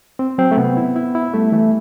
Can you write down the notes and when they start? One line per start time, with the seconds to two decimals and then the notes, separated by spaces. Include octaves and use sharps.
0.19 C4
0.38 F#3 C4
0.51 A3
0.57 C3 B3
0.77 E4
0.96 E4
1.15 E4
1.33 G3 A3
1.52 E3 A3